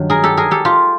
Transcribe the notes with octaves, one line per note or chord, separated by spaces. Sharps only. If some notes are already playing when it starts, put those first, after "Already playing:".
Already playing: G2 D#3 F#3
G#4 A#4
G4 A4
G#4 A#4
G4 A4
F4 G4